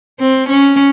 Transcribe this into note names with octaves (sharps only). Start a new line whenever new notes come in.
C4
C#4